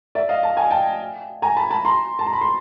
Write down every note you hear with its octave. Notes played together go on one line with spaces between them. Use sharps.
D5 E5
D#5 F5
A5
G#5
G5 A5
G#5 A#5
A5 B5
A5 B5
A#5 C6
A5
A#5
B5
C6